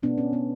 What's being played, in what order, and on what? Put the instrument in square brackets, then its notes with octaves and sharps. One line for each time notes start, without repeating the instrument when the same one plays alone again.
[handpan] B2 A3 B3 D4
C#4
B3